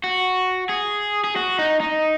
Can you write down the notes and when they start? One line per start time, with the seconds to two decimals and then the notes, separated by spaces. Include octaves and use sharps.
0.04 F#4
0.69 G#4
1.24 G#4
1.36 F#4
1.59 D#4
1.80 D#4